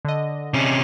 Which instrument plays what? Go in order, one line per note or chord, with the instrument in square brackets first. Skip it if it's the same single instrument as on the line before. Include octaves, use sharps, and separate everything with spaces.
[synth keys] D3 D#5
[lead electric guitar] C3 C#4